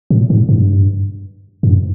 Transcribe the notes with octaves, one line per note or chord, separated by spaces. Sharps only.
A2
G#2
G2
F#2